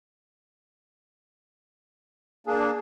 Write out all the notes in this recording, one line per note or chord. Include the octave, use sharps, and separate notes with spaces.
A#3 D4 G#4